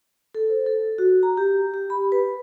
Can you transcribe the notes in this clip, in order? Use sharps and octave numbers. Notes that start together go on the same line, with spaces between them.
A4
C5
A4
F#4
A#5
G4
G4
B5
B4